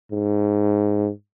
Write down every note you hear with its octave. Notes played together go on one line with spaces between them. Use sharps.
G#2